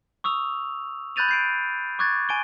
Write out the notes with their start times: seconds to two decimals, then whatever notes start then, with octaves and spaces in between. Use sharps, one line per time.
0.24 C#6 D#6 E6 F7
1.16 B5 F#6 G6 A6 D#7 F7
1.29 G6 C7 D7
1.99 C#6 D6 F#6 G#6 A6
2.29 G#5 D7 G7